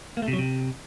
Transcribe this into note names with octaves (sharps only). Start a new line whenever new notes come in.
A#3
A3
C3
F#3
C3